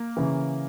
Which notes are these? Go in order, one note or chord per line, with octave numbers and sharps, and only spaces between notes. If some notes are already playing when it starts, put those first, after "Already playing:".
Already playing: A#3
C#3 E3